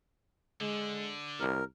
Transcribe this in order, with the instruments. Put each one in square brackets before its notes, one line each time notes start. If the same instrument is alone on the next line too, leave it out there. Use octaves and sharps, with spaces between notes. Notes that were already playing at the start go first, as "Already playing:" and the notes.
[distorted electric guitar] D3 [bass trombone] G#3
[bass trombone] C2 [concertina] A#4